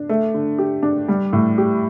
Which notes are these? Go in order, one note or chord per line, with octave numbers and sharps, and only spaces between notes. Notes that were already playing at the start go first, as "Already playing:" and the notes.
Already playing: D4
A3
D3
G4
D4
G3
A2
G4